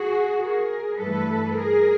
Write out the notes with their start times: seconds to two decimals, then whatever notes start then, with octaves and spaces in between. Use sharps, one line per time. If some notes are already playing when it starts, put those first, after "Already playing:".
Already playing: F#4 G#4
0.41 G#4 A#4
0.98 G2 E3 A3 A4 B4
1.55 G#4 A#4